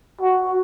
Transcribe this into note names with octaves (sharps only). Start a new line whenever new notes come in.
F#4